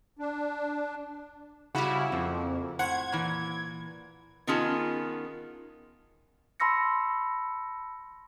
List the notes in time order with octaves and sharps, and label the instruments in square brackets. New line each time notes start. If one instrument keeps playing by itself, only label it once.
[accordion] D4
[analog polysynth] C#3 E4 [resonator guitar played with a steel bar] G3 F#4
[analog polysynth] F2 [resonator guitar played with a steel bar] A#3
[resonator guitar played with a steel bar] A2 C5 F#5 [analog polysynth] G#6
[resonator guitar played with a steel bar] A#2 E3
D#3 B3 C#4 F4 G#4 A5
[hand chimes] A5 B5 C6 E6 A#6 C#7